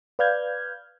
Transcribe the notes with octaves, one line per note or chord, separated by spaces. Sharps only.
B4 D5 F5 F6 G6 G#6